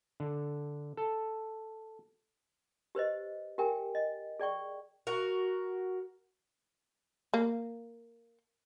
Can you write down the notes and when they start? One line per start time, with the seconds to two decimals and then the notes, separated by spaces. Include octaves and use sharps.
0.20 D3
0.97 A4
2.95 G4 B4 C5 D#5
3.58 G4 A#4 G5 G#5
3.95 D#5
4.40 G#4 D5 G5 C#6
5.07 F#4 A#4
7.34 A#3